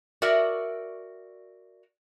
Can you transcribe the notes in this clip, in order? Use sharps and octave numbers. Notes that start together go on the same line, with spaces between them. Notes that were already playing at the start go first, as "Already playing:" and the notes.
F#4 A#4 D5 E5